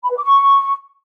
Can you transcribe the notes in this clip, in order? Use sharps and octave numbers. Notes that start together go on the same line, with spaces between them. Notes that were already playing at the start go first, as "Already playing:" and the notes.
B5
B4
D6
C#6